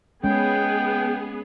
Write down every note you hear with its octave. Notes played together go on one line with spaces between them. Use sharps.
G#3 B3 C#4 G#4 G5